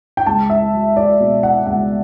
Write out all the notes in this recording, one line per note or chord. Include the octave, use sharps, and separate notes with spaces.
G5
C#2 A5
E5
F#3
D5
B2
F#5
C#2 F#5